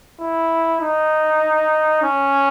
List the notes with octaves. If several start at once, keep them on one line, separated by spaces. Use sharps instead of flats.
E4
D#4
C#4